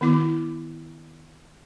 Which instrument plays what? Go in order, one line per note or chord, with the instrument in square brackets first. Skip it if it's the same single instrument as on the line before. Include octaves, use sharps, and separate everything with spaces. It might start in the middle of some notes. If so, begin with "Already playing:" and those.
[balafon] D#3 B3 E4 D6